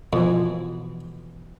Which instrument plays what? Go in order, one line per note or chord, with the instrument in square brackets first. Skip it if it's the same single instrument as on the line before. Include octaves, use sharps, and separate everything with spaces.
[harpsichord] F2 [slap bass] B2 E3